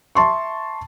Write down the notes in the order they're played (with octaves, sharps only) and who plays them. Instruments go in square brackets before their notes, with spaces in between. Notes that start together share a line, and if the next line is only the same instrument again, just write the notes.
[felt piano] E5 A5 C6 C#6